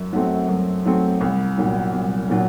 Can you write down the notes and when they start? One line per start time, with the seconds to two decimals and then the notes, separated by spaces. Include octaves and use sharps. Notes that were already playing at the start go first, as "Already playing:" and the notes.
Already playing: F#2
0.13 F#3 A3 C4
0.49 F#2
0.85 F#3 A3 C4
1.21 C2
1.58 A#2 F#3
1.93 C2
2.29 A#2 F#3